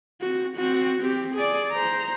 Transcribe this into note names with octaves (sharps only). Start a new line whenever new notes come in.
C4 F#4
C4 F#4
C4 G4
G#4 D5
C5 A#5